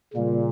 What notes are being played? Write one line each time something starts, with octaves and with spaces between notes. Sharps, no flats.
A#2 C#3 G3 A#3